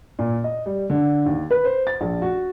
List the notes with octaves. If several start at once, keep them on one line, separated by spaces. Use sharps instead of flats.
A#2
D#5
G3
D3
D#2
B4
C5
A6
A#1
F#4